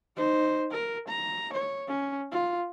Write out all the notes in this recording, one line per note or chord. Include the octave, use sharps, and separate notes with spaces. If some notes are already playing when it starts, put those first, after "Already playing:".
D#4 C5
A#4
A#5
C#5
C#4
F4